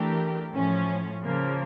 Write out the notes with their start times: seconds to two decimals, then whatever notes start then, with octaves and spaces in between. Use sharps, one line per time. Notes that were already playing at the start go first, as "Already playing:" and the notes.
Already playing: E3 A3 D4 G4 A#4
0.54 A2 F3 C#4
1.24 C#3 F3 A#3